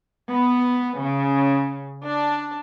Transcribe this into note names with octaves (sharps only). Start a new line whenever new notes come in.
B3
C#3
D4